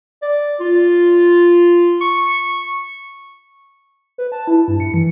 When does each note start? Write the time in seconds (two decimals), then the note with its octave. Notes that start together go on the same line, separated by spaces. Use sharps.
0.22 D5
0.60 F4
2.01 C#6
4.18 B4
4.32 A5
4.47 E4
4.68 G2
4.80 C#7
4.94 E3